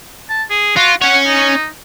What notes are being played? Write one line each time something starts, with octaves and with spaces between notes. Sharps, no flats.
A5
G#4
F4 F#4
C#4 C#5 F#5
D#4